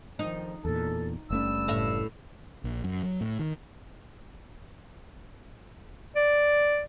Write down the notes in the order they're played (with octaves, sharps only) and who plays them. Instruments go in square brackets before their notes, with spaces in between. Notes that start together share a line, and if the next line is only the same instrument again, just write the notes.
[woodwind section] F2 D#3 F3 [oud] D#4
[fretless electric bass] E2 A#2 [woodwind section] A4
[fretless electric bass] F#1 A3 C#4 [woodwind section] G2 G3 E6
[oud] A2 E5
[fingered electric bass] A#1
F#2
F#3
A2
D#3
[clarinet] D5